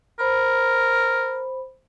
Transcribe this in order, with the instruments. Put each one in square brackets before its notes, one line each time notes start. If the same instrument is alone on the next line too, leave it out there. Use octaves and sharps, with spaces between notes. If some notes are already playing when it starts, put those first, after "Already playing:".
[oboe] A#4 [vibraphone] C5 B5